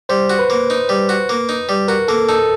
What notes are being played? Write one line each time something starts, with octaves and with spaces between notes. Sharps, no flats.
G3 C5
F#4
B4
A#3
D#4
G3
F#4
A#3
D#4
G3
F#4 A#4
A#3 A4
D#4 A4